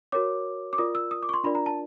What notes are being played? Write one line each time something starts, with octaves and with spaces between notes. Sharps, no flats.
F#4 A#4 C#5 D6
D6
F4 A#4 D5 D#6
E6
D#6
D6
C#6
C6
D4 F4 A#4 D5 B5
A#5
A5